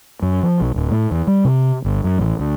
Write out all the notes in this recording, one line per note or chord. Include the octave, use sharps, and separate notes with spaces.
F#2
F3
B1
D1
A2
E2
G3
C3
G1
F#2
A1
D2